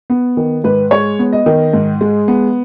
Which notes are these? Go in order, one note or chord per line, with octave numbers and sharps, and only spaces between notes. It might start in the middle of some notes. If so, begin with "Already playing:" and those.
B3
D#3
G#2 B4
G#3 C#5
B3
D#5
D#3
G#2
G#3
B3